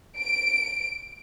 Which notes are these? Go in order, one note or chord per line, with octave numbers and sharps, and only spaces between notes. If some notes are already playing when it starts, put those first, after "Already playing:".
D7